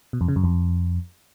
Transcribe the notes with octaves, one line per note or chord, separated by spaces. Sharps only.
B2
F2
C#3
F#2
F2